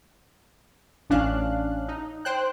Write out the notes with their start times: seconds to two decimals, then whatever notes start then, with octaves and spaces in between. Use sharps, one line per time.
1.10 A1 C#4 D4 F5 F#6
1.88 D#4
2.25 C5 G5 F#6